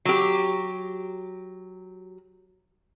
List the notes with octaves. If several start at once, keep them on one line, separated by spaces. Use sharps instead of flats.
F#3 G4